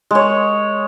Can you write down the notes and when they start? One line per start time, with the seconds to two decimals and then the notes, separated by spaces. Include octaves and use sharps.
0.11 G#3 C#5